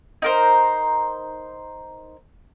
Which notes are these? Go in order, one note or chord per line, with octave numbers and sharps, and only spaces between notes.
D#4 A#4 C5